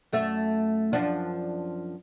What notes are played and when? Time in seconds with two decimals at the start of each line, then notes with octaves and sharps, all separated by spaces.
0.12 F#2 A3 E5
0.93 F#2 F3 D4